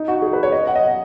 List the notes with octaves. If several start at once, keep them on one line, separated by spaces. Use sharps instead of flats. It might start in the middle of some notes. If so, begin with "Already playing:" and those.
Already playing: D#4
F#4
G#4
B4
C#5
D#5
F#5
D#5
F#5